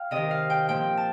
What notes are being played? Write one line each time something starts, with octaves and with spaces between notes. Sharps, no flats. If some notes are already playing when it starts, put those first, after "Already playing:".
Already playing: F5 G5
C3 D#3 D#5
F5
G5
A#2 F3 G5
A5